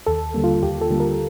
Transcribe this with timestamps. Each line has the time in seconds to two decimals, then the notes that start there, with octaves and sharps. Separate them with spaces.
0.06 D#2 A4
0.34 D3 G3 A#3
0.44 F4
0.63 D#2 G4
0.81 A4
0.90 D3 G3 A#3
1.00 A#4